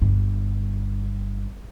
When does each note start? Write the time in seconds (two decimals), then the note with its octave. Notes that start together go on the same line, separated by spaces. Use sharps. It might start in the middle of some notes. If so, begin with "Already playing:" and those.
0.02 G1 G2